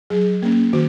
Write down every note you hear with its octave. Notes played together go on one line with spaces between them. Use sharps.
F#3 G#4
A#3 C#4
D#3 F#4